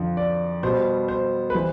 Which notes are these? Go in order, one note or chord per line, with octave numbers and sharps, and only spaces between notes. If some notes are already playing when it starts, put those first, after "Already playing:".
Already playing: F2 D3 F3
D5
B2 G3 C5
C5
B4
E3 G3 C5